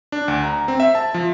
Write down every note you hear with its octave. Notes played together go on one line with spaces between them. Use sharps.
D4
D2
A#5
C4
E5
A5
F3